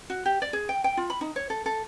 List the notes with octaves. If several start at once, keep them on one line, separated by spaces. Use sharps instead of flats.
F#4
G4
D5
G#4
G5
G5
F4
B5
D#4
C#5
A4
A4